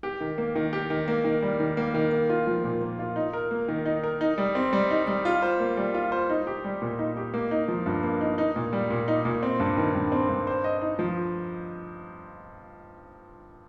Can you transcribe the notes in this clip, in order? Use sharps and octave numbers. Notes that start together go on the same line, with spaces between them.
G4
D#3
A#3
D#3
G4
D#3
A#3
D#3
G3
D#3
A#3
D#3
A#3
F4
F3
A#2
A#3
F4
D#4
A#4
A#3
D#3
D#4
A#4
D#4
G3
C4
G3
D#4
G3
F4
C5
A#3
G3
F4
C5
D#4
G4
G3
A#2
D#4
G4
A#3
D#4
F3
G2
A#3
D#4
D#4
A#2
G3
A#2
D#4
A#2
C4
G2
D#3
G2
C4
G2
C5
D#5
D#4
F3